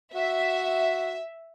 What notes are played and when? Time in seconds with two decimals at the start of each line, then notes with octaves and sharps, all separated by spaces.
0.15 F#4 E5